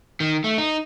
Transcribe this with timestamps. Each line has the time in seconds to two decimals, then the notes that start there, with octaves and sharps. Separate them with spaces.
0.20 D#3
0.44 A3
0.58 D#4